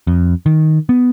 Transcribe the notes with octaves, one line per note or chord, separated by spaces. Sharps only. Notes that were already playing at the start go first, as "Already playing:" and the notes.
F2
D#3
B3